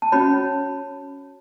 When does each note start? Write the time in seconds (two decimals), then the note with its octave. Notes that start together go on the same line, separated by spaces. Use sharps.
0.02 A5
0.12 C#4 F#4 C#5 B5